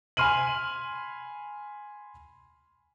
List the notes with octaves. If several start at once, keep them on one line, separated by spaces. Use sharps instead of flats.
G#5 B5 C6 F6 D#7 F#7